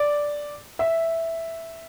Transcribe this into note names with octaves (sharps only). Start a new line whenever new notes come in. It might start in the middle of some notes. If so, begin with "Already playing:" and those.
Already playing: D5
E5